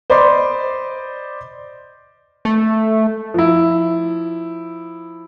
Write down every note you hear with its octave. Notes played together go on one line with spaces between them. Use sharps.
C5 D5 D#5 B5 C6 D6
A3
F3 E4